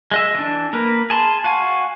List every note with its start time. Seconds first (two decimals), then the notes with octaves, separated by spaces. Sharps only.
0.11 G#3 D#5 E5
0.35 E3 D4
0.73 A#3 A#4 B4
1.10 G#4 A5 C6
1.44 F#4 F5 G#5